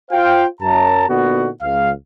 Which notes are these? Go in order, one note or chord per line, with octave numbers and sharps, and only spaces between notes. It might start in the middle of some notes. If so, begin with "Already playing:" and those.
F4 C5 F5 G5
F#2 A5 A#5
A#2 D3 B3 D#4 F#4
C#2 F5